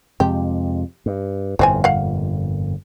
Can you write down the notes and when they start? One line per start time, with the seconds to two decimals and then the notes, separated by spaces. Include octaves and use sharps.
0.20 F2 C3 G#3 G4
1.06 G2
1.59 G1 F2 A#2 E3 C4 G#5
1.84 F5 F#5